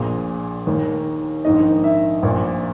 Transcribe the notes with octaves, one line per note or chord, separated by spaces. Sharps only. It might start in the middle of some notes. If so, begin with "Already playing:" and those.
Already playing: A#1 A#2 G#4
D#2 D#3
A#1 G#2 D#3 D#5
E5
A#1 A#2